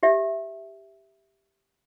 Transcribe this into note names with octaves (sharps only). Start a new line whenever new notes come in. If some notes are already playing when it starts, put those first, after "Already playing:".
G4 E5